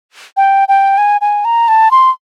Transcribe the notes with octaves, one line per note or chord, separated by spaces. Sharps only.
G5
G5
G#5
G#5
A#5
A5
C6